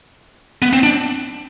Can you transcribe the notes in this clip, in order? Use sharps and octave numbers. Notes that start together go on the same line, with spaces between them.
B3
C4
D4